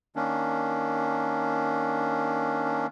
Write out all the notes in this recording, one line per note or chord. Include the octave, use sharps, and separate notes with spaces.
D#3 A#3 C#4 D4